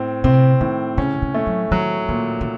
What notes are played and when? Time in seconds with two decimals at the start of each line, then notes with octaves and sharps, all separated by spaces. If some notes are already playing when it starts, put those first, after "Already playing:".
Already playing: A2 C4
0.24 C3 C4
0.61 A2 D#3
0.98 C#3 C#4
1.22 C#3
1.34 A3
1.47 F#3
1.71 D#3 F#3
2.09 A#2 D#3
2.41 D#3